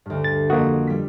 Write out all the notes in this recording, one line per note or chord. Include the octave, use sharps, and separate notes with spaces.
D2 G2
A6
F2 A#3 F#4 D#6
G3 B6